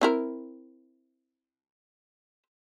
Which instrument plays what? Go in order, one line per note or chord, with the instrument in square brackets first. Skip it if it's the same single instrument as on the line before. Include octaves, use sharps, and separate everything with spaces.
[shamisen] C4 E4 A#4